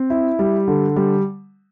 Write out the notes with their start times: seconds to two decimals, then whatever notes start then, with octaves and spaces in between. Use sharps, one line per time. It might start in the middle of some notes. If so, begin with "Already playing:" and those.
Already playing: C4
0.10 E4
0.39 G3
0.68 D3
0.96 G3